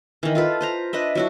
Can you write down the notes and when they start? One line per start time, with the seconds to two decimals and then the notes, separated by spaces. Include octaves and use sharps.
0.23 D#3 E3
0.35 F4 A4 B4
0.61 B4 C5 A#5
0.93 D4 B4 D#5 E5
1.15 F#3 E4 F#4